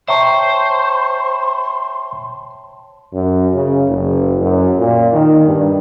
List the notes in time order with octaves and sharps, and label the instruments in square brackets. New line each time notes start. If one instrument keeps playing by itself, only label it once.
[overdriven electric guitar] C5 [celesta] C#5 G5 A5 [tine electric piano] E5 A#5 C#6 [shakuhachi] C6
[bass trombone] F#2
C#3
F#1
F#2
A#2
D#3
G2